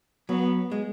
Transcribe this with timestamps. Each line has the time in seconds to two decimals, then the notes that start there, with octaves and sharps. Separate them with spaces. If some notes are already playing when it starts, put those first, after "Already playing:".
0.29 F#3 B3
0.72 G#3